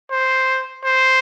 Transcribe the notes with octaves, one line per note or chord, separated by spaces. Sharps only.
C5
C5